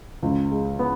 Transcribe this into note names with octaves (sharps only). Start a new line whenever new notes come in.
C#2
G#3
B3